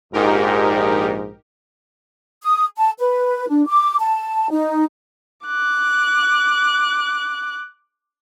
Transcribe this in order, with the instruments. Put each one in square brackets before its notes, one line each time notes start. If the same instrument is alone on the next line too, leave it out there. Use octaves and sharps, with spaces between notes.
[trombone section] A#1 G#2 [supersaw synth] D#4 G4 A#4
[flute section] D#6
A5
B4
D4
D6
A5
D#4
[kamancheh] D6 F#6